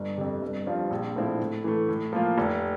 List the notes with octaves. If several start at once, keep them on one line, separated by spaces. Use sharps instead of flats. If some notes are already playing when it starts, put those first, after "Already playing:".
Already playing: G1
F2 C3
G1
G2 F3 C4 F4
A#1
A2 F3 C4 E4
A2
E3 A3
A2
F3 A#3 F4
F1